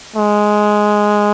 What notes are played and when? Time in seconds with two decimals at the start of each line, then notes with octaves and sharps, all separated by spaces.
0.16 G#3